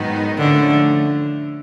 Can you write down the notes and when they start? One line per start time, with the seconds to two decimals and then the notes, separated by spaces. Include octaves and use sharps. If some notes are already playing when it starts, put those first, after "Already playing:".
Already playing: G#2 D#3 F#3 B3 D#4
0.37 A2 D3 F3 A3 C#4